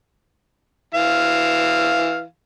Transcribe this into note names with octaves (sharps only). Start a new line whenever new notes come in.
E3 F5